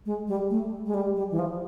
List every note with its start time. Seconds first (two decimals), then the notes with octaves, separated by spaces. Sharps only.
0.06 G#3
0.28 G3
0.50 A3
0.86 G#3
0.94 G3
1.16 G3
1.31 E3
1.39 F3